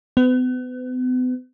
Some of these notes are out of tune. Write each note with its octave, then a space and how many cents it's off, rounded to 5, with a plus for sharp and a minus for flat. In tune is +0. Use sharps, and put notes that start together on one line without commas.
B3 +40